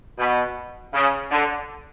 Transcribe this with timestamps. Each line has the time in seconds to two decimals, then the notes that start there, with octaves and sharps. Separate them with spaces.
0.18 B2
0.94 C#3
1.32 D3